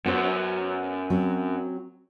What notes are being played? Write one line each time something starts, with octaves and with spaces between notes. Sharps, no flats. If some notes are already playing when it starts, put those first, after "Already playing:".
F#2 B3 C5
F#3 C4